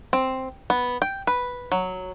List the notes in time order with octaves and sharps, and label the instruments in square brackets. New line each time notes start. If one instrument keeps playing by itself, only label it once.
[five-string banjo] C4
B3
G5
B4
F#3